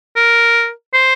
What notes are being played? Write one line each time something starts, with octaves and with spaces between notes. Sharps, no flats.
A#4
C5